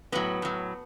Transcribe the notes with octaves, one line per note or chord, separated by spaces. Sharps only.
A2 F#3 B3
A2 F#3